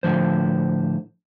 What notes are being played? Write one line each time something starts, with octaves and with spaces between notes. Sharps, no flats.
A2 D3 F3 C5